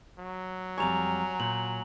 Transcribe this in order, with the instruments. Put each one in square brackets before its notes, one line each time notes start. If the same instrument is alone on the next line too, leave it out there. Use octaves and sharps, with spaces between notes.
[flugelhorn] F#3
[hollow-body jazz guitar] F2 G3 C#5 [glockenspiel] G#5 A#5 F7
[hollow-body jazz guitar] A#2 [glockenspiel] F#7